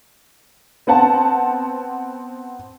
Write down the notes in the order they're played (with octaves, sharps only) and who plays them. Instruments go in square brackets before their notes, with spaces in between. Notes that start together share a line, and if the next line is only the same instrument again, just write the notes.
[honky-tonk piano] B3 C4 F#5 A5